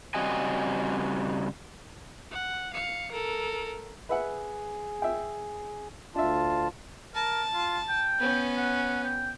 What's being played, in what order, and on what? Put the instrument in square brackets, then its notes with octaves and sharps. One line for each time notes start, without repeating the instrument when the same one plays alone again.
[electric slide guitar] C#3 G3 C4 F#4 D#5 G#5
[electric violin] F#5
F5 C#7
A4 A#4
[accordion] G#4 [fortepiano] B4 E5 F#5
[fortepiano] E5 G5
[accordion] D2 F4 A5 [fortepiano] D4 E5
[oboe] A#4 [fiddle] A5
[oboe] F4
G5
[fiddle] B3 C#4
[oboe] F#5
G5